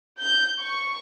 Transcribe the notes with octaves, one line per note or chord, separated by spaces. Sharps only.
G6
C#6